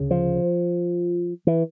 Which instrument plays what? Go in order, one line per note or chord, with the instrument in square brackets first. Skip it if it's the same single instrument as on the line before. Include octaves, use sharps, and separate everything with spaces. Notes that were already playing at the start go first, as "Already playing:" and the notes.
Already playing: [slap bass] D2 C#3
F3
E3